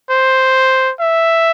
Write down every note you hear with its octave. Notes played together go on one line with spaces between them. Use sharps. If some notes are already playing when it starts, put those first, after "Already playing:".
C5
E5